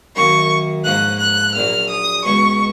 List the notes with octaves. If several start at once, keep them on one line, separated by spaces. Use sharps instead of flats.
F#2 D#3 F#3 A#3 C#6
G#2 F3 A#3 C#4 F#6
F#6
A#1 A#2 F#3 F6
D#6
C#2 B2 G#3 C#4 C#6